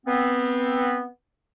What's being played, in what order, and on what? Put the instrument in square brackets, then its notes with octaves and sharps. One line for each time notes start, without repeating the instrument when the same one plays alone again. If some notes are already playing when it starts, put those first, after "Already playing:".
[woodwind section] B3 C4